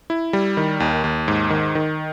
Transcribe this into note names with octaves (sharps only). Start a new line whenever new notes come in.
E4
G3
D#3
D#2
D#2
G#2
D#3
D#3